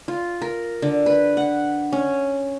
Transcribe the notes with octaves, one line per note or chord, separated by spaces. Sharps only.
F4
A#4
D3
B4
F#5
C#4